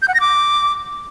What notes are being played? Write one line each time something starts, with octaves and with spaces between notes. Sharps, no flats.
G6
F#5
A#6
D6